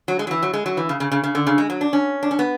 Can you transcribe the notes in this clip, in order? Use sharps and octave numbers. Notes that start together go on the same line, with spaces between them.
F#3
G#3
F#3
E3
F#3
G#3
F#3
E3
C#3
C#3
C#3
C#3
D3
C#3
G#3
F#3
D4
C#4
D4
C#4
B3